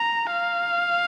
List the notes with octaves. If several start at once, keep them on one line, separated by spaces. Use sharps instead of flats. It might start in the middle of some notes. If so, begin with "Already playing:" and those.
Already playing: A#5
F5